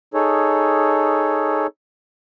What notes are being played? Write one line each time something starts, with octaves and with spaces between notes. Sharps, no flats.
D#4 G#4 A4 C#5